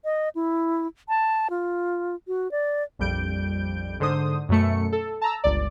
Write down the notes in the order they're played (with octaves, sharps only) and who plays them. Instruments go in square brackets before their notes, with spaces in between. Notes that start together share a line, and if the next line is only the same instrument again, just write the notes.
[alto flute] D#5
E4
A5
F4
F#4
D5
[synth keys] A#1 F2 G3 G6 D7
G#2 D3 C5 D#6
F#2 B2 A3 C#7
A4
A5 A#5 E6
G1 C#2 D5